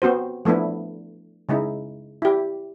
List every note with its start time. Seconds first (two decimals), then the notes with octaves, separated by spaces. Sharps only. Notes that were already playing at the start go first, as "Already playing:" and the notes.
0.02 B3 C4 F#4 C5
0.45 F3 A3 B3 D4 E4
1.49 C#3 G#3 D#4 E4
2.22 E4 G4